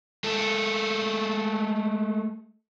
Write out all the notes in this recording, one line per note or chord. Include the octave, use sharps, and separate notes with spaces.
G#3 A3 A4